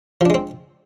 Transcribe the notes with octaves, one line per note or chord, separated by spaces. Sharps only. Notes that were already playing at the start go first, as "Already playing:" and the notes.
F3 G#3 C4 D4